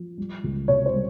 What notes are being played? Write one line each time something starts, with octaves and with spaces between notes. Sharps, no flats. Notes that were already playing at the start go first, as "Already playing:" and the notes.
Already playing: F3
G3
C#2
C3 C#5
C5
G3